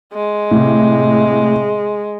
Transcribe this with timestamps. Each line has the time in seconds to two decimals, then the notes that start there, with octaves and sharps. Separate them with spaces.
0.13 G#3
0.51 A2 C3